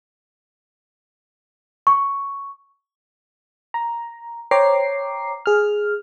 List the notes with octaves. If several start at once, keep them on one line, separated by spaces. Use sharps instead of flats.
C#6
A#5
C5 C#5 G5 A#5 D6 C7
G#4 F6